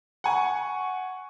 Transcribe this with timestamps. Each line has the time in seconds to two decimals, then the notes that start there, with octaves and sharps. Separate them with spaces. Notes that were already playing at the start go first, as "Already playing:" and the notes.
0.24 F#5 G#5 C#6